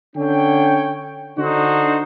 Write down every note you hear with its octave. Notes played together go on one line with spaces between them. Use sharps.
D3 C#4 C#5 G5
D3 D4 D#4 F#4 C5